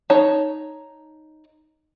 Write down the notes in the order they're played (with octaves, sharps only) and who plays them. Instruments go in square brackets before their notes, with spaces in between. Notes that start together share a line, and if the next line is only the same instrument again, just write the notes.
[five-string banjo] D#4 C#5 A5